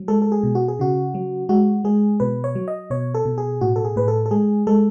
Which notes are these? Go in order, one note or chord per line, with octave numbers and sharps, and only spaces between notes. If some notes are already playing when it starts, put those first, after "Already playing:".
Already playing: F#3
G#3 A4
A4
G#4
B2
F#4
G#4
C#3 F#4
F#3
G#3 F#4
G#3 G#4
B2 B4
C#5
F#3
D#5
B2 C#5
A4
B2
G#4
A2 F#4
A4
G#4
A2 B4
A4
A4
G#3 G#4
G#3 A4